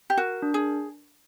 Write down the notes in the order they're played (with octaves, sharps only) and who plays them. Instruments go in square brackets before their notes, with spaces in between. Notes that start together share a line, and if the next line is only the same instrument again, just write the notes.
[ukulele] G4
[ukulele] F#4 [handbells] A#4
[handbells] D4
[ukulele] G#4